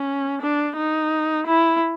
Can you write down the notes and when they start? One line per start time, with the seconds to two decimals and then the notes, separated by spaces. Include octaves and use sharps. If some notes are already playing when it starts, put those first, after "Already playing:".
Already playing: C#4
0.41 D4
0.77 D#4
1.47 E4